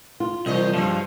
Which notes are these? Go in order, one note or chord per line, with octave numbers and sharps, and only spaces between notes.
F4
C2 E3 C#4 D#5
G2 C#3 F3 C4